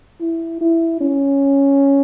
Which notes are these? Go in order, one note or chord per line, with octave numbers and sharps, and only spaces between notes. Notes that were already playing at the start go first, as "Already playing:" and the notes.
E4
E4
C#4